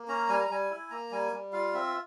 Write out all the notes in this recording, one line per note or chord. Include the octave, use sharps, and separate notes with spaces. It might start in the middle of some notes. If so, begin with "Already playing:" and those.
Already playing: A#3
C#4 A#5
G3 G#5
A#5
G3 G#5
E4
A#3 A#5
G3 G#5
G3
F4 F5
C4 E5